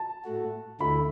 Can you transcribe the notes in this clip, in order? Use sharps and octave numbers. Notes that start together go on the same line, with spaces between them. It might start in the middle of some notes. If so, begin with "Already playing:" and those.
Already playing: A5
A2 A3 F#4
D2 D3 A3 E4 B5